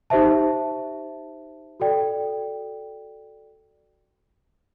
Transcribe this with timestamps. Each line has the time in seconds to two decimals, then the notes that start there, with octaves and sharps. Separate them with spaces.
0.10 D#4 G4 C5 E5 A5
1.80 F#4 A4 D5 G5